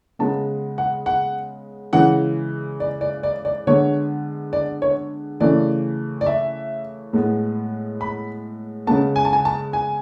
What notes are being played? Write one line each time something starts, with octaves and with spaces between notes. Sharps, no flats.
C#3 G#3 B3 A5
F#5
F#5
C#3 E3 G#3 F#5
D5
D5
D5
D5
D3 G#3 B3 C#5
D5
C#5
C#3 E3 A3 D5
D5
E5
A2 G#3 B3
B5
C#3 G#3 B3 A5
G#5
A5
G#5
A5
G#5